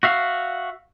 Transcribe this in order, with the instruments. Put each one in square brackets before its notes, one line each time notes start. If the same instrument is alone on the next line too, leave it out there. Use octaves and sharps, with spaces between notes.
[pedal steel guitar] F#4 E5 F5